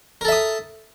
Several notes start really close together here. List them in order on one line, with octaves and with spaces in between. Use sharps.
A#4 A4 E5 D#6